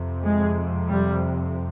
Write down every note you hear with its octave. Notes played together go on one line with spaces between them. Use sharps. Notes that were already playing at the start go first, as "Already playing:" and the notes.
Already playing: F2 C3
G#3
G3